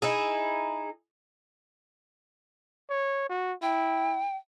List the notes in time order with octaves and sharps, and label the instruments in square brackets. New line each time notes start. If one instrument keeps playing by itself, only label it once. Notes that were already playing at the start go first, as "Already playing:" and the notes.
[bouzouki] D#4 E4 G#4
[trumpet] C#5
F#4
[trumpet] E4 [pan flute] G5